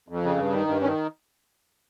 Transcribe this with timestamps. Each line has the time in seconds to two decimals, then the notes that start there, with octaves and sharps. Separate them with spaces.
0.08 F2
0.23 C#3
0.37 G2
0.53 D#3
0.67 G2
0.81 D#3 C#4